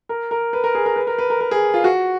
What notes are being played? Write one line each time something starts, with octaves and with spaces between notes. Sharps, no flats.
A#4
A#4
B4
A#4
G#4
A#4
B4
A#4
B4
A#4
A#4
G#4
F4
F#4